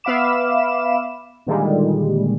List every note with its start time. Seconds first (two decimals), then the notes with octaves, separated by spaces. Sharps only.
0.04 B3 E5 F5 B5 D6 E7
1.46 A#2 D3 D#3 G3 G#3